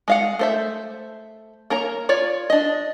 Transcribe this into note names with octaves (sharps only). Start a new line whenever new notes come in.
G#3 F5 F#5
A3 C5 E5
A#3 A#4 C#5 A#5
F4 C#5 D5
D4 D#5